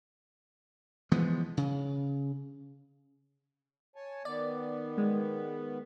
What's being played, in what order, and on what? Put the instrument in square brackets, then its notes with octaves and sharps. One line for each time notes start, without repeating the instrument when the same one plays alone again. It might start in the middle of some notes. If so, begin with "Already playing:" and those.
[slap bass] E3 F3 G#3 B3
C#3
[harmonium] C#5 G#5 A5
[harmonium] D#3 B3 [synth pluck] D5
[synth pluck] G#3